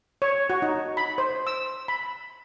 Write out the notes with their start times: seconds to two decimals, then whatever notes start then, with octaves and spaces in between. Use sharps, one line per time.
0.22 C#5
0.50 F#4
0.62 D#4
0.97 B5
1.18 C5
1.47 E6
1.88 B5